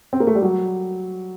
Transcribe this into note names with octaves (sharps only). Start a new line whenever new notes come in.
C4
A#3
A3
G3
F#3